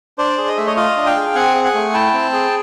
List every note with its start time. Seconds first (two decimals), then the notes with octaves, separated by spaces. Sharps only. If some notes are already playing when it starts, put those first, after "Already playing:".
0.18 D4 C5 D5
0.38 G#4
0.48 D#5
0.57 A3 E5
0.66 C#5 D#5
0.77 F4 D#5 F5
0.97 D4
1.06 F5 G5
1.16 G#4
1.35 C4 F#5 G#5
1.55 G#4
1.64 F#5 G#5
1.75 A3
1.94 E4 G5 A5
2.13 C4
2.33 G#4